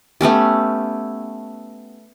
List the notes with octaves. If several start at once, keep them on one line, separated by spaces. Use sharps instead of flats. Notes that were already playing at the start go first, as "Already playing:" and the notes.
A3 B3 C#4 G4